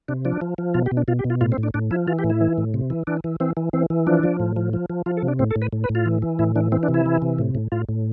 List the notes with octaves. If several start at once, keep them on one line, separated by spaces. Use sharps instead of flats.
C3 D4
F3 D4
F3
F3
B2 F4
G4
B2
D4
B2 F4
G4
B2
F4
A2 F4
C4
A2
D4
A2 D4
F3 E4
E3 F4
G4
A2
E4
E3
A2
C3
E3
E3 D4
E3
E3 C4
E3
E3 C4
E3
F3 D4
F3
A2
F3
F3
F3
F3 F4
A4
C3
D4
A2 C4
A4
A2
B4
A2
B4
A2
F4
E3
E3
A2 E4
E3 D4
E3 C4
D4
C3
E4
E3
C3
A2
A2
A2 F4
A2